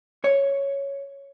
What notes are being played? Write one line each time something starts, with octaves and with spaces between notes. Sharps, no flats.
C#5